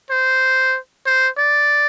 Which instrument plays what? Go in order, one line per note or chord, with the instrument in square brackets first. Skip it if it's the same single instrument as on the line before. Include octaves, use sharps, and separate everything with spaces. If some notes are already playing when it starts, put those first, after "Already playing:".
[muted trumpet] C5
C5
D5